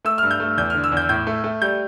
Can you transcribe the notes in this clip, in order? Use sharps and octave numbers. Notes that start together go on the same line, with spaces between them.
A3 E6
F6
G2
G6
A3
E2 G6
D3 F6
E6
E2
G6
A2 G6
A3
A3
G3 G6